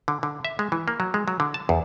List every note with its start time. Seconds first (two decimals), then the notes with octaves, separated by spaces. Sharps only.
0.08 D3
0.23 D3
0.45 E5
0.59 G#3
0.72 E3
0.88 A#3
1.00 F#3
1.14 G#3
1.28 F#3
1.40 D3
1.54 A5
1.69 E2